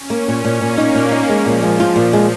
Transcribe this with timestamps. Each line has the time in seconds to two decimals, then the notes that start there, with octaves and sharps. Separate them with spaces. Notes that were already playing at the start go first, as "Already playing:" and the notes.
Already playing: C#4
0.10 A#3
0.28 A#2 C#4
0.44 A#2
0.61 A#2 A#3
0.78 D#4
0.95 A#2
1.11 D#4
1.29 F3 G#3
1.46 A#2
1.62 G#3
1.80 F4
1.96 A#2
2.13 G#3